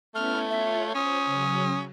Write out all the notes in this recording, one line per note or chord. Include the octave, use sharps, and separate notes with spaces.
A3 B3 C#4 E4 F6
F4 C#5 E5
C#4 C5 D#6
C#3 F#3